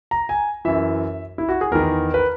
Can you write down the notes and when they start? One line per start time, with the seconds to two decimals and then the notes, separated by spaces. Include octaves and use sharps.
0.11 A#5
0.29 G#5
0.65 F#2 E3 E5
1.38 E4
1.49 F#4
1.61 G#4
1.71 E2 D#3 A#4
2.14 B4